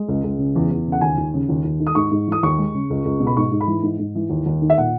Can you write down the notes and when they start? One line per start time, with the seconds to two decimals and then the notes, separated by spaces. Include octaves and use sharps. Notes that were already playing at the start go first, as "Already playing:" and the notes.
Already playing: G#3
0.08 C#2
0.24 C#2
0.39 C#3
0.56 E2
0.71 E2
0.87 C#3
0.92 F#5
1.01 D#2 G#5
1.18 D#2
1.34 C#3
1.49 D#2
1.64 D#2
1.80 D#3
1.87 D#6
1.95 G#2 C#6
2.11 G#2
2.28 E3 D#6
2.43 D#2 C#6
2.58 G#3
2.74 C#3
2.90 C#2
3.05 C#2
3.20 B2
3.27 B5
3.37 G#2 C#6
3.52 G#2
3.61 B5
3.67 E3
3.83 G#2
3.99 G#2
4.15 E3
4.30 D#2
4.46 D#2
4.62 D#3
4.70 E5
4.78 A#2 F#5